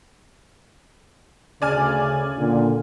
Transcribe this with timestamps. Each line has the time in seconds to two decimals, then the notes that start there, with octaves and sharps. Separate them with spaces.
1.62 D2 C#3 D5 G#5 F6
2.37 A#2 D3